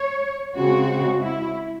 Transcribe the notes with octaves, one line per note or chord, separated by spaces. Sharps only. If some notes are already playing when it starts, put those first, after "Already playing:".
Already playing: C#5
C#3 G#3 C4 F#4
E4